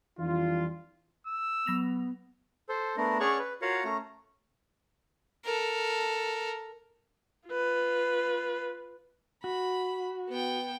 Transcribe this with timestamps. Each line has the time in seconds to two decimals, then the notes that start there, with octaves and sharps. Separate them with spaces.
0.19 F2 E3 G3 D4 F4
1.27 E6
1.66 F#3 B3 A#6 F7
2.69 A4 C5
2.97 A3 B3 D4 A#4
3.20 C#4 G#4 C#5 D5 F#5 C#6
3.39 B4
3.62 F4 F#4 A#4 C#5 F5 F#5
3.84 A3 C#4 A#5
5.45 A4 A#4
7.48 F4 B4
9.44 F#4 B5
10.29 B3 G5